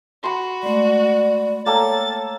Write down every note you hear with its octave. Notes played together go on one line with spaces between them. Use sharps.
F#4 B5 C6
G#3 A3 D5
A#3 A4 C#5 F5 G5 A#5 A6